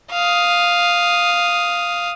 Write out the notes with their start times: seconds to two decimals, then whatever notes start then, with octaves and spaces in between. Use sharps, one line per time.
0.11 F5 D#6